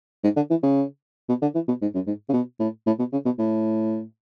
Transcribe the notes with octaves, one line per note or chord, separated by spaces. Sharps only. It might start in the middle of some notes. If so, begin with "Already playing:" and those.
G#2
D3
E3
C#3
B2
D3
E3
B2
G#2
F#2
G#2
C#3
B2
A2
A2
B2
C#3
B2
A2